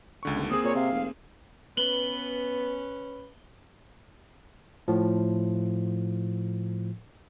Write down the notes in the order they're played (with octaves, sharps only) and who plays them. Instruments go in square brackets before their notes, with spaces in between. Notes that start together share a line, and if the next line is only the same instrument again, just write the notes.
[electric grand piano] C#2 D3 C#6
[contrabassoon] D#1
[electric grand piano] A#3 C4 G#4 [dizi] D#6
[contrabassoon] A#2 [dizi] C#5
[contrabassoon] C3 [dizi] F5
[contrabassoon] F1
[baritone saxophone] B3 [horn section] C#4 B4 [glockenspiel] F#7 G7
[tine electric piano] A2 F3